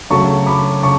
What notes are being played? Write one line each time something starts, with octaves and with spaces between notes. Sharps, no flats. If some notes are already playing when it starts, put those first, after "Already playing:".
C#3 F#3 A3 A5 C#6
B5 D6
C#3 A5 C#6